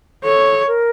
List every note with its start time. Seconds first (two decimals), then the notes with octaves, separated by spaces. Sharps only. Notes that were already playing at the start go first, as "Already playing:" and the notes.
0.24 A4 C#5
0.67 A#4